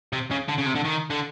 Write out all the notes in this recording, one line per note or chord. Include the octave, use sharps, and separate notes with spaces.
C3
C#3
D3
C#3
C3
D3
D#3
D3